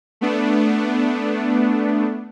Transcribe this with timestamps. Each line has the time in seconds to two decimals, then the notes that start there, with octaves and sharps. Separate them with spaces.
0.21 A3 B3 D4